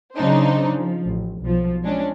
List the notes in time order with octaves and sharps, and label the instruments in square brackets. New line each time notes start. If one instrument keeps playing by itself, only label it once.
[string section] C#3 F#3 D4 D#4 C5
F3
A1
B1 F3
G#3 C#4 D4